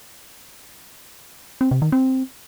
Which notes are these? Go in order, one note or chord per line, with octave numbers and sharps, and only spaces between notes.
C4
C3
D#3
C4